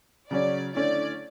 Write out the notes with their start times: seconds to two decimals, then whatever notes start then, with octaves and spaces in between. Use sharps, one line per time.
0.30 C#3 F#3 C#4 D5
0.74 D3 A3 C#4 E4 D5